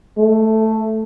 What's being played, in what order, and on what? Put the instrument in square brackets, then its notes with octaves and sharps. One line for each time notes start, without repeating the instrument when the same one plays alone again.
[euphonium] A3